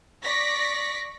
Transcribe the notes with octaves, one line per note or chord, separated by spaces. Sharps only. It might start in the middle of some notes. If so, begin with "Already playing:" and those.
D5 C#6 A#6 B6